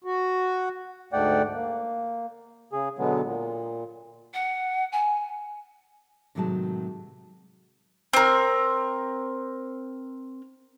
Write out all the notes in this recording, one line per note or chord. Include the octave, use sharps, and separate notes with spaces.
F#4
D2 G#2 A3 D5 F#5 G5
A#3
C#3 G#4
B2 D3 F#3 G#3 B3
A#2
F#5
G#5
A2 C3 D#3 F#3 G#3 A5
C4 A#4